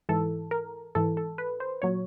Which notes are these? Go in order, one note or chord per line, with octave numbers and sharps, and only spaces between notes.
G#2 E3 A4
A#4
G#2 E3 A4
A4
B4
C5
A#2 F#3 C#5